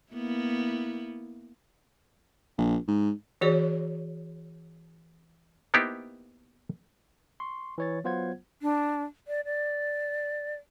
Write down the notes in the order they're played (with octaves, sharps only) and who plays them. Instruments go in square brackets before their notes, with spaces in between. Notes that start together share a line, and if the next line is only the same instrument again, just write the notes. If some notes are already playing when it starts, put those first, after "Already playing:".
[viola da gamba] A#3 B3 E4
[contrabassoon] A#1
G#2
[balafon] E3 F#4 G#4 C#5 D5
[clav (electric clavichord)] A#3 B3 D#4 E4 G4 C5
[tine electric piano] C6 C#6
E3 C#5 A6
F#3 B3 F4 C5 F#5 G#6
[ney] D4
D5
D5